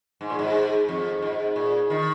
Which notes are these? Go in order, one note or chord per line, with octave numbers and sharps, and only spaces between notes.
G#2
A#2
G#2
F2
G#2
A#2
D#3